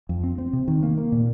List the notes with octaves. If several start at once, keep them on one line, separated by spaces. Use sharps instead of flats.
F2
C4
C4
C3
D#3
A#3
A#3
A#2